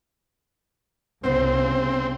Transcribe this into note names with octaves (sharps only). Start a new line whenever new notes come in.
C2 G2 C#3 B3 C4 C5